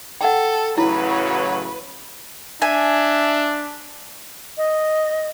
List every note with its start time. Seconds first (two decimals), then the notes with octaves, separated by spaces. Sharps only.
0.21 A4 F#5 G5
0.78 A1 C#3 F#3 E4 B4
2.62 D4 E5 G#5
4.58 D#5